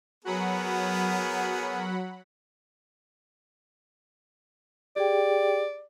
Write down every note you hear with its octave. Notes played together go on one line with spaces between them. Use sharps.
F#3 B3 G#4 A#4 F#5 B5
G4 G#4 D5 G5